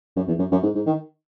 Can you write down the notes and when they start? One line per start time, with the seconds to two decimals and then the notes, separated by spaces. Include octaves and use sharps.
0.16 F#2
0.28 E2
0.39 F#2
0.52 F#2
0.63 G#2
0.75 G#2
0.86 D#3